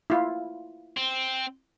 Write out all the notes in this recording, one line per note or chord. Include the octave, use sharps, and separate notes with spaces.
E4 F4
C4